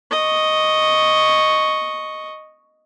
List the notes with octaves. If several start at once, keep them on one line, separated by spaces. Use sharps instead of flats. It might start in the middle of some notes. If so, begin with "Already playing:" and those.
D#5 C#6